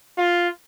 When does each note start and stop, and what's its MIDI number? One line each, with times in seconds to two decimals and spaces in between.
0.18 0.48 65